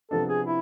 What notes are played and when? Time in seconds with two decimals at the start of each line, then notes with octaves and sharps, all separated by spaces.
0.11 C3 F3 B3 D4 A4
0.29 G#4
0.46 E4